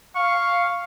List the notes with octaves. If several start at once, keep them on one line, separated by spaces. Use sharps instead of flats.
F5 C#6